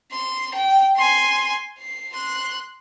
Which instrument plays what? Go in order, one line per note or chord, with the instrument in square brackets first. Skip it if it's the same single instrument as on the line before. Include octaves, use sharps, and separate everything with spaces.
[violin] C6
G5
G#5 C6
C7
C6 F#6